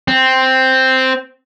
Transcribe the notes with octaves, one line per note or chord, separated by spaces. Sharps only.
C4